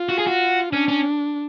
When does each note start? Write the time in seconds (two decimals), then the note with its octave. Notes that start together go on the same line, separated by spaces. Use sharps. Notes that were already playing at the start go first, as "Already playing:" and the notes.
Already playing: F4
0.09 F#4
0.18 G#4
0.26 F#4
0.73 C#4 D4
0.88 C#4